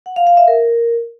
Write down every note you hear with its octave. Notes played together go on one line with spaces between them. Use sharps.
F#5
F5
F5
E5
A#4